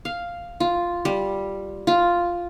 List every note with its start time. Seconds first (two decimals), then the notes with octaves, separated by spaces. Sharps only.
0.05 F5
0.60 F4
1.05 G3
1.87 F4